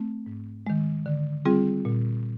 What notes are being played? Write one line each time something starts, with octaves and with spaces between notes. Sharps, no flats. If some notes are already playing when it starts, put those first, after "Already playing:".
Already playing: A3 C4
G#2
D#3 G#3
D3
G3 C4 F4 G#4
A#2